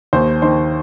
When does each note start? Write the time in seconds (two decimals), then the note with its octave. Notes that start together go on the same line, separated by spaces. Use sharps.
0.13 D#2 C5
0.42 D#3 C5